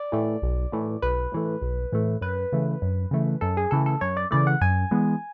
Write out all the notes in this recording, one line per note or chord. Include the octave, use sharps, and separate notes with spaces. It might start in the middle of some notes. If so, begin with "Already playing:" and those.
Already playing: D5
A2 E3 A3
B1
A2 E3 A3
B1 B4
A2 E3 A3
B1
A2 E3 A3
F#2 B4
C#3 E3 A3
F#2
C#3 E3 A3
F#2 A4
G#4
C#3 E3 A3 A4
A4
F#2 C#5
D5
C#3 E3 A3 D5
F#5
F#2 G#5
E3 G#3 B3